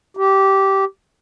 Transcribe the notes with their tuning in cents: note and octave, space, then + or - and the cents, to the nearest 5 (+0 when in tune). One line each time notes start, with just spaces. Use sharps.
G4 -15